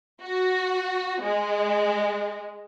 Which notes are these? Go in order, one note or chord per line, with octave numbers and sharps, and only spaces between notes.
F#4
G#3